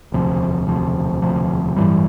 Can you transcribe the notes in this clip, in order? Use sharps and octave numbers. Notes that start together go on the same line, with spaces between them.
E1 D2 C3 F3
E1 D2 C3 F3
E1 D2 C3 F3
A1 G2 E3 G3